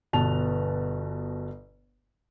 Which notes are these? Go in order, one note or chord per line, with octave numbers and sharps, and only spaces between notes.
G1 B2 B3 A5 F7